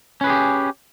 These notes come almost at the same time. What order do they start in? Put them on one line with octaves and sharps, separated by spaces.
C#4 B4 G#4 G4